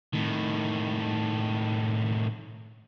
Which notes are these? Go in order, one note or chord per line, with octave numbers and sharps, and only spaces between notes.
A2 D#3